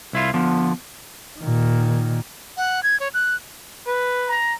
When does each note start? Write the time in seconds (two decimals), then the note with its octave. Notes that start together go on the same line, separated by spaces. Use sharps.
0.13 C2 E4 F4
0.34 D3 F3 B3
1.39 A#2 D#3
2.57 F#5
2.83 G#6
3.00 C#5
3.14 F#6
3.87 B4
4.28 A#5